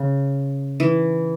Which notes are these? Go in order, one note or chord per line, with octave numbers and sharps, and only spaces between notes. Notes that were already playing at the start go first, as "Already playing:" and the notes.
Already playing: C#3
E3